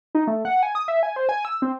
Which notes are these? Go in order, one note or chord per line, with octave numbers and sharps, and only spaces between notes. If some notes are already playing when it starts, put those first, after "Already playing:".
D#4
A3
F#5
G#5
D#6
E5
G#5
C5
G#5
E6
C4